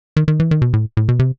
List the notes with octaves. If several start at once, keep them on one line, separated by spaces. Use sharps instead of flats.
D#3
D#3
E3
D#3
B2
A2
A2
B2
C3